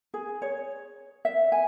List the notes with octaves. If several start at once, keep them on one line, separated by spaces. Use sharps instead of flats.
G#4
C#5
E5
G#5